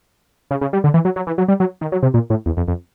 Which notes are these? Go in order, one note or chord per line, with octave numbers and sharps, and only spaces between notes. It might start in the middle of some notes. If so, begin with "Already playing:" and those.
C#3
C#3
G3
D3
E3
F#3
F#3
E3
F#3
G3
F#3
D#3
F#3
C3
A#2
A2
E2
F2
F2